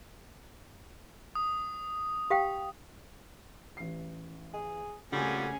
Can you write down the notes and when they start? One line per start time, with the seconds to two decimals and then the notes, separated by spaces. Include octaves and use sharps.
1.35 D#6
2.30 G4 F5 G5
3.77 A1 C7
4.53 G#4
5.12 F2 A#2 C#3 G3 A3 C#4 F#4 G#4